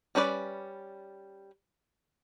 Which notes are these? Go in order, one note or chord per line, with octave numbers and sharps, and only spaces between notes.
G3 C#4 D4 B4 D5